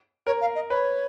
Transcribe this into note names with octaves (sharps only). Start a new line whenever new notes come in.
A#4 C#5
F5
D#5
B4 C#5